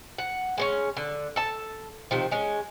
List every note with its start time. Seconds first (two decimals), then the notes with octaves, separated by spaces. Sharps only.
0.18 F#5
0.58 G#3 B3 C#4
0.97 D3
1.36 A4 A5
2.11 C3 D#3 F3
2.31 G#3 C#4